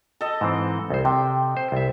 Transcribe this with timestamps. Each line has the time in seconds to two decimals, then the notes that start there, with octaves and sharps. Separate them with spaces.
0.21 A4 D#5
0.41 G#2 E3 C4
0.90 C2 C5
1.05 C3 G5
1.57 C5
1.72 C2 E5